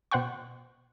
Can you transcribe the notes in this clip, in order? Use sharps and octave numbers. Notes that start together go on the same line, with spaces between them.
B2 C5 F#5 G5 C#6